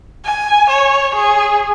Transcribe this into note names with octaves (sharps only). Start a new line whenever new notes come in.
G#5
C#5
G#4